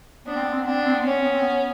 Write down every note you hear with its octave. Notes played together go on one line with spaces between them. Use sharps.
B3 D4
C4
B3
C4
B3
C4 D4
B3
C4
B3
C4
B3 C#4
C4
B3
C4
B3